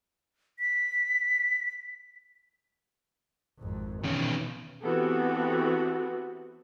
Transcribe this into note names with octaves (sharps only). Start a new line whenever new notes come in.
B6
G#1 F2
B2 D#3 E3 C#4
E3 B3 C4 F#4 G4 A4